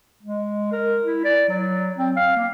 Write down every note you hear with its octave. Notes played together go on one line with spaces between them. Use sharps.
G#3
A#4
E4
D5
F#3
C4
F5
A#3